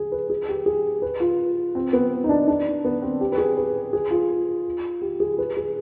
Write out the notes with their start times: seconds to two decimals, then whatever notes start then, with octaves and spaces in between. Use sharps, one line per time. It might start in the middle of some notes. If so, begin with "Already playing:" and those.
Already playing: G#4
0.12 B4
0.30 G#4
0.49 G4
0.66 G#4
1.02 B4
1.20 F4
1.75 C4
1.93 B3
2.24 D#4
2.29 D4
2.48 D4
2.85 B3
3.02 C4
3.21 G4
3.32 B4
3.38 G#4
3.57 B4
3.93 G#4
4.11 F4
5.02 G4
5.20 G#4
5.38 B4
5.57 G#4